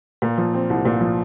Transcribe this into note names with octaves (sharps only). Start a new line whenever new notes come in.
A#2
F3
C4
C2
A#2
F3